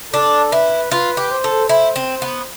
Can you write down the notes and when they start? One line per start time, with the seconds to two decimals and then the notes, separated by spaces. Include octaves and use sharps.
0.13 D4 A4
0.52 E4 B4
0.91 F4 B4
1.17 G4
1.31 C5
1.44 A4
1.69 E4 C5
1.96 C4
2.22 B3